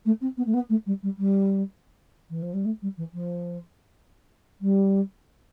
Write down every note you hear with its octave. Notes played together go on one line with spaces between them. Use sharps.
A3
C4
B3
A3
B3
A3
G3
G3
G3
E3
F3
G3
A3
G3
E3
F3
G3